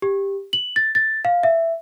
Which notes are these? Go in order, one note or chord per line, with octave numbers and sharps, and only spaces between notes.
G4
F#7
A6
A6
F5
E5